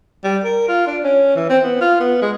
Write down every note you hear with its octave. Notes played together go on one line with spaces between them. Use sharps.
G3
A#4
F4
D4
C#4
E3
C4
B3
F4
B3
G#3